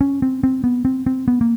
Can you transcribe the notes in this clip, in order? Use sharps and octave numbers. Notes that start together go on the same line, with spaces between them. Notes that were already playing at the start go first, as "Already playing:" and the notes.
C#4
C4
C4
B3
C4
C4
B3
A#3